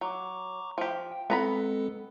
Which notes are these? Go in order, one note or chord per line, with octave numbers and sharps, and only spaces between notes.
F#3 A#5 C#6 D6
F3 G4
G5
G#3 B3 C4 A4 A#5 B5